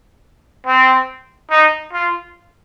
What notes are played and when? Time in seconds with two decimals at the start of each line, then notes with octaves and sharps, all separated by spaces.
0.66 C4
1.50 D#4
1.93 F4